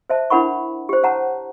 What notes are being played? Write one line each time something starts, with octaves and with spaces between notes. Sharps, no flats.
C5 E5 A5
D4 E4 A#4 F#5 B5 C#6
G4 C5
C#5 F#5 A5 A#5